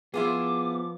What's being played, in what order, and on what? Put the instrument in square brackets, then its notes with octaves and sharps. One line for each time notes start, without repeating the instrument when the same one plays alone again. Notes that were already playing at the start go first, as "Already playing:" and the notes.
[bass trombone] F3 [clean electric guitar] B3 [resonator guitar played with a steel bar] E4 F4 G#4 [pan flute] D6